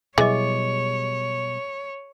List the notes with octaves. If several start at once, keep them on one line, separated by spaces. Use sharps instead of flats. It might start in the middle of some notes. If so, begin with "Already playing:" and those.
B2 E3 F#3 G3 G#4 C#5 D#5